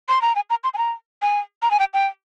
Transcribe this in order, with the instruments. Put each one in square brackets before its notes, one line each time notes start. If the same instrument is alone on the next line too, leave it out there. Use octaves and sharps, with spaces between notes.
[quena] C6
A#5
G#5
A#5
C6
G#5
A#5
G#5
A#5
G#5
G5
G5